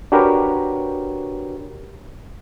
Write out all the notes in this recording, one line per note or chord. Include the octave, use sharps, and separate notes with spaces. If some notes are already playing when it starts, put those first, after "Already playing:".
D4 F#4 G4 A#4 B4 C#5